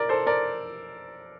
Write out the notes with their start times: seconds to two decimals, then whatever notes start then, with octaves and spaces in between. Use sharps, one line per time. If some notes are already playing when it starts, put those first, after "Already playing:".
Already playing: A#4 D5
0.09 A4 C5
0.27 A#4 D5